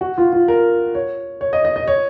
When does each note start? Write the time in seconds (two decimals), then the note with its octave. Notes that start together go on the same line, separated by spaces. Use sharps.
0.01 F#4
0.18 F4
0.33 F4
0.48 A#4
0.95 C#5
1.41 C#5
1.53 D#5
1.65 D#5
1.76 D#5
1.88 C#5